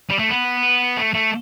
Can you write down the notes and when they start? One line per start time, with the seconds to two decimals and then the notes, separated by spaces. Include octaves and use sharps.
0.10 G3
0.19 A3
0.29 B3
0.97 A3
1.14 A3